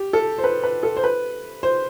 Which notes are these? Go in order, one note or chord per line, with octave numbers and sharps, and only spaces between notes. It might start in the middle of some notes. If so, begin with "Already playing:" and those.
Already playing: G4
A4
C5
B4
B4
A4
C5
B4
C5